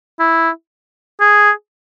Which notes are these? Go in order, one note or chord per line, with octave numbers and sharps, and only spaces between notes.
E4
G#4